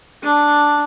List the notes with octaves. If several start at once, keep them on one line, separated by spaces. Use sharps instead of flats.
D4